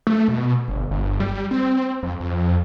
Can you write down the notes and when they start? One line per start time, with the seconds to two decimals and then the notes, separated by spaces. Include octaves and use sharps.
0.07 A3
0.28 B2
0.68 G1
0.91 G1
1.20 G3
1.51 C4
2.03 F2
2.21 F2